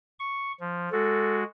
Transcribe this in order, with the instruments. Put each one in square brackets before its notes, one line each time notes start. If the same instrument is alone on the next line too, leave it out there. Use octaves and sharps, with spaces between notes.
[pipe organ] C#6
F3
[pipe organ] G#3 F#4 [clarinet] A4